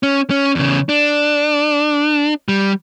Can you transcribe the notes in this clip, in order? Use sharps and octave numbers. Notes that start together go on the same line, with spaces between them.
C#4
C#4
E2 C#3
D4
G3